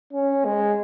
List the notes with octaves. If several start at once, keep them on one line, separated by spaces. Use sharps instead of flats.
C#4
G#3